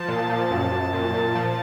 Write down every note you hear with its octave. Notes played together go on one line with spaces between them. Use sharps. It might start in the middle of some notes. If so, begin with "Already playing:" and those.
Already playing: F3 A5
A#2
F3
F#2
F#2
A#2
A#2
F3